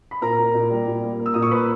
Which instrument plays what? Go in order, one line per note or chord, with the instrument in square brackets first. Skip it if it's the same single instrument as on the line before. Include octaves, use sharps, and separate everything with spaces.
[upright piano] B5
A#2 A#4 A#5
A#2
A#2
G3
A#2
A#3
A#3
E6
A#2 D#6
C#6
A#3 B4 B5